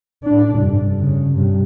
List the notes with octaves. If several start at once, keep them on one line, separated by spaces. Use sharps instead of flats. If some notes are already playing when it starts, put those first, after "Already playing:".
A2 D4
F1 G2
C#3
G2 C3